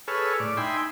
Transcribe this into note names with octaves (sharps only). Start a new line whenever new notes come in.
G#4 A4 B4 C#5 E6 F6
A2 D5
D#4 E5 G5 G#5 B5 C6